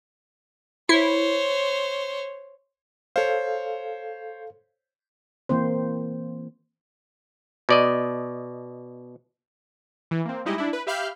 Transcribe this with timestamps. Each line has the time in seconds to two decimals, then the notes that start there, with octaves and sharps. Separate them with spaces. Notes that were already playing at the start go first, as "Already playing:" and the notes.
0.89 E4 C5 C#5
3.16 A4 C5 C#5 F5
5.49 E3 A#3 C4 C5
7.69 B2 D5 D#5
10.11 E3
10.25 A#3 C4
10.45 G3 G#3 D#4 E4 G4 D#5
10.58 D4 E4
10.73 B4
10.87 G4 E5 F5 B5 F6 G6